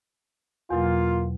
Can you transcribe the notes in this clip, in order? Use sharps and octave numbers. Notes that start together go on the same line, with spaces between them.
E2 B2 F#3 A#3 F4